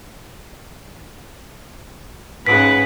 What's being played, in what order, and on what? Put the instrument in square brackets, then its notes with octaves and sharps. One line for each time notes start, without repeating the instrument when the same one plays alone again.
[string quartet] G#2 C#3 [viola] B4 F#5 [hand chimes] B6 D7